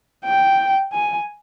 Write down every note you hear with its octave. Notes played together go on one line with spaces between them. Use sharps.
G5
G#5